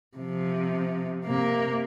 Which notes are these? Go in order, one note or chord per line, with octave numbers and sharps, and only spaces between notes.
C3 F3
C3 A#3